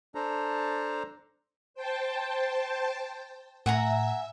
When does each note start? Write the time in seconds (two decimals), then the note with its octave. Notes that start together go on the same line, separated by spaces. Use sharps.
0.15 D4 A4 C5 A#5
1.74 C5 G5 A5
3.66 A2 E5 F#5 G#5 A#5